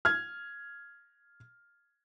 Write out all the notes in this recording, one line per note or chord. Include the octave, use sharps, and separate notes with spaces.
F6 G#6